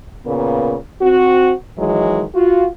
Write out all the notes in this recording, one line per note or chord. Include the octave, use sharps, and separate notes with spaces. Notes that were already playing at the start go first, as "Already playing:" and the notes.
A#2 C#3 B3 A#4
C4 F#4
D#3 E3 F#3 G#3
F4 F#4